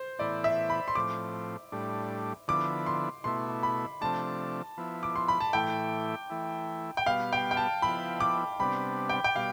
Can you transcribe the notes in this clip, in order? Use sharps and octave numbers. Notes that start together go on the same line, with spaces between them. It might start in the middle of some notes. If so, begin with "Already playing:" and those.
Already playing: C5
A2 E3 B3 E4 D5
E5
B5
C6
A2 F3 C4 D6
A2 G3 D4
D3 F3 B3 E4 D6
C6
B2 A3 E4 C6
B5
C3 F3 A3 D4 A5
F3 B3 E4
D6
C6
B5
A5
A2 E3 A3 E4 G5
E3 A3 E4
G5
B2 G3 B3 F5
G5
G5
A5
F3 B3 E4 B5
D6
C3 G3 B3 D4 B5
G5
G5
B2 G3 F5